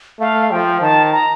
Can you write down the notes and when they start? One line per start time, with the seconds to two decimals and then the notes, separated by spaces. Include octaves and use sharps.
0.20 A3 F5
0.51 F3 G5
0.82 D#3 A5
1.13 A#5